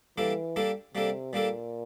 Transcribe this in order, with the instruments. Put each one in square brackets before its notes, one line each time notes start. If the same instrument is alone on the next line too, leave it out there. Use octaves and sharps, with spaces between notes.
[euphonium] E3 [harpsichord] G3 A#3 D4 A4
[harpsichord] G3 A#3 D4 A4
[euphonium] C3 [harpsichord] G3 A#3 D4 A4
[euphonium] A#2 [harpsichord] G3 A#3 D4 A4